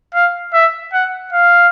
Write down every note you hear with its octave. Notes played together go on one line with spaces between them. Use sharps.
F5
E5
F#5
F5